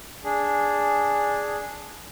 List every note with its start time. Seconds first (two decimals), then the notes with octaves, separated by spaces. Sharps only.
0.24 D4 G#4